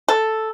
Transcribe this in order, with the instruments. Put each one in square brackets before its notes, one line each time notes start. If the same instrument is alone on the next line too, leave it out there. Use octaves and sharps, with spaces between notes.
[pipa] A4